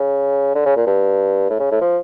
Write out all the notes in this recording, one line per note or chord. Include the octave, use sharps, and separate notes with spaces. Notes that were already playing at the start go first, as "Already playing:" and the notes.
Already playing: C#3
D3
C#3
A#2
G2
A2
C#3
A2
F3